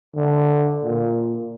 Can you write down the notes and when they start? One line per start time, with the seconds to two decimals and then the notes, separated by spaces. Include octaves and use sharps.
0.15 D3
0.83 A#2